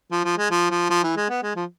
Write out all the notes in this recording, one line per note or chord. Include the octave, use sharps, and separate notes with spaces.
F3
F3
G#3
F3
F3
F3
E3
G#3
B3
G#3
F3